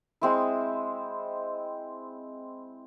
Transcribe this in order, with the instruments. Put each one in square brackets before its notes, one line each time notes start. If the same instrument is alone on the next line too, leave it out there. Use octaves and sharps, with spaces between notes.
[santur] G#3 C4 E4